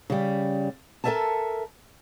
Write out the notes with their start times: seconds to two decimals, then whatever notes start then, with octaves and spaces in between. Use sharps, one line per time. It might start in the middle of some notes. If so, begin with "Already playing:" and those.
0.10 C#3 G3
1.04 A4 A#4 C#5 E5 G#5 A5